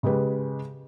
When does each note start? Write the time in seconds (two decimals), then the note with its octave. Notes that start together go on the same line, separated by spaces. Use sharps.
0.03 C#3 G#3 G4 B4